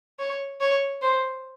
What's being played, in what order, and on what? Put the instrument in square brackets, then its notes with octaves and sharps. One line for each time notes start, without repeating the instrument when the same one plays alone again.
[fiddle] C#5
C#5
C5